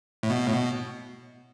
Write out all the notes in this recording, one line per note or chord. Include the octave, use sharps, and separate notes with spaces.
A2
B2
A2
B2